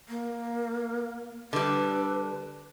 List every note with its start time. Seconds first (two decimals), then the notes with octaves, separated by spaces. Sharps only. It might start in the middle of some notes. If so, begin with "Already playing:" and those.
0.09 A#3
1.53 D3 G3 B4